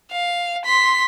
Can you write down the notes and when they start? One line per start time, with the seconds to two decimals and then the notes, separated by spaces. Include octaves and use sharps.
0.11 F5
0.65 C6 B6